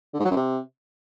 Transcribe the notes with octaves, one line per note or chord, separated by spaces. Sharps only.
D3
G#2
F#3
F#2
C3